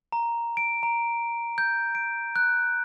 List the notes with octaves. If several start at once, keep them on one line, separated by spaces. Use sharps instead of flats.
A#5
D7
A#5
G6
D7
F#6